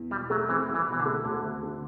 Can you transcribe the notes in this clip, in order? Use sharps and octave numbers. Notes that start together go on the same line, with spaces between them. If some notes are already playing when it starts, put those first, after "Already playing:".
Already playing: E2
B2 G3
F#3 A3
E3 C4
C2
E3
B2
E3
D3
A3
D2 D3
D2
D3